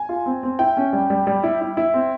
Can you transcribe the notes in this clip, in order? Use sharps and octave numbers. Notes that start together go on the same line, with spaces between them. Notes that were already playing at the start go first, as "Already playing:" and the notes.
Already playing: G#5
F4
C4
C4
E4 G5
C#4
G3
G3
G3
E4
E4
E4
C4